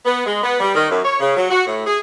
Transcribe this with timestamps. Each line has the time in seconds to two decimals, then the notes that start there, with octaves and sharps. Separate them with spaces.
0.06 B3
0.26 G#3
0.44 B3
0.60 G3
0.75 D#3
0.90 F#2
1.04 C#5
1.20 C#3
1.37 F#3
1.51 F#4
1.67 A2
1.87 G#4